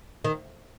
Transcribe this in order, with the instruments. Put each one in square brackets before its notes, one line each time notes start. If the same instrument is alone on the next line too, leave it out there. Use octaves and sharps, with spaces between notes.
[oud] D#3